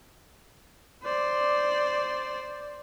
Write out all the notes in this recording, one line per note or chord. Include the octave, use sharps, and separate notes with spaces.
C5 D5